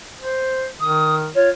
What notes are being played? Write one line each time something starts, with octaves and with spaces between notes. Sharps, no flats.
C5
D#3 D#6
F4 C#5